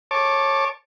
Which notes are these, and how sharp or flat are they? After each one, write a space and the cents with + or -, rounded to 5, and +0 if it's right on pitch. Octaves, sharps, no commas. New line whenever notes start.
C#5 -20 A5 +0 D6 +0